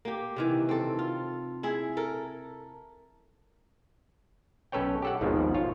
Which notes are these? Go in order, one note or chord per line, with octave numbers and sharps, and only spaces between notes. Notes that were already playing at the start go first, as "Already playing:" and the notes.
A#3 G4
C3 D#3 E3
C4 A4
F4
E4 G#4 E5
A4 A#4
B1 C#4 A4 B4 C#5 G5
G4 A4 F#5
G#1 D#2 G#2 B2 D#3 F3
F4 C#5